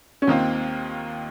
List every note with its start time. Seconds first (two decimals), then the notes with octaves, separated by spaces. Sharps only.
0.22 C#4
0.27 D#2 D#3 A#3 C4 F4